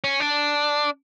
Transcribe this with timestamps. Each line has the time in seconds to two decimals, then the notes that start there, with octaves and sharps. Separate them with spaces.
0.04 C#4
0.20 D4